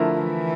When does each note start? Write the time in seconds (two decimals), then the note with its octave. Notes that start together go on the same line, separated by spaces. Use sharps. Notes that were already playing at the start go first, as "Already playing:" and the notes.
Already playing: D3 F3 A3 E4 A#4
0.18 E3